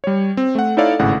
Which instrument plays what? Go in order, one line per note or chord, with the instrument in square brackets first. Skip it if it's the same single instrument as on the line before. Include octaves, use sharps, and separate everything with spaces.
[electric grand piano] G3 C#5
C4
A3 F#5
D#4 E4 A4 C#5 D5 F5
G#1 A2 C#3 F#5